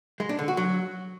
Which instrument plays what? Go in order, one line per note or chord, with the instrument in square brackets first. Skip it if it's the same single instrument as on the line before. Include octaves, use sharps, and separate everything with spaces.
[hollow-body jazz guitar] G#3
D4
D3
F#4
F#3